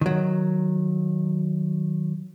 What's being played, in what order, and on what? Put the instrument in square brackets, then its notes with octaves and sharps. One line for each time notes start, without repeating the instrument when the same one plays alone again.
[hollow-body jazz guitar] D#3 F#3